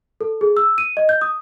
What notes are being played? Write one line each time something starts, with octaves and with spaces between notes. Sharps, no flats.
A4
G#4
E6
D#7
D#5
G6
D#6